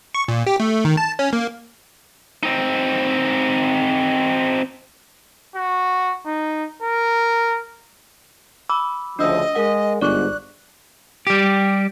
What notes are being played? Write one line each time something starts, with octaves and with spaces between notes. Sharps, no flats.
C#6
A#2
G4
A3
D#3
A5
C#4
A#3
C4 D#4
F#4
D#4
A#4
B5 D6 E6
D2 C#3 F3 D4 D#5 D#6 E6
G#3 A#4 F#5
G1 G#2 D5 C#6 D6 F#6
G3 G4